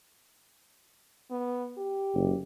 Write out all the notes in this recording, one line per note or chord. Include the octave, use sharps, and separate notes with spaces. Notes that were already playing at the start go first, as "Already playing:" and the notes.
B3
G4
F#1